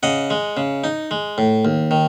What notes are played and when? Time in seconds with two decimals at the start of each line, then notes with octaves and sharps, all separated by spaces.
0.03 C#3 D#5 F#5
0.30 G#3
0.57 C#3
0.84 D#4
1.11 G#3
1.38 A2
1.65 D#2
1.91 D#3